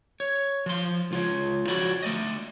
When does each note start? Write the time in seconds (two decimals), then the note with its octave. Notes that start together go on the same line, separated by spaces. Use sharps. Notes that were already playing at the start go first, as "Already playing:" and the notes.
0.20 C#5
0.66 F3 C6
1.11 C#2 F4 C#5
1.68 F3 F#4 C#5 D5 B5
2.03 A3 D5 D#5